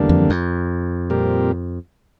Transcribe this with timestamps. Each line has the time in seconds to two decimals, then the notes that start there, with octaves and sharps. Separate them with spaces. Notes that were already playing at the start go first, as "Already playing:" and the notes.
Already playing: E2 D3 G3 A#3 D4
0.09 F2
0.30 F2
1.10 A#2 G3 C4 G4 A#4